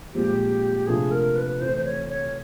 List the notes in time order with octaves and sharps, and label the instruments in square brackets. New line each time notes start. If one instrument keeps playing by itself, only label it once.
[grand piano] A#2 F3 G#3 C4 [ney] G4
[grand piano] C3 F3 A3 D4 F4 [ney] G#4
[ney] A#4
B4
[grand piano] E3 A3 C4 [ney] C5
[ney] C5
C#5
C#5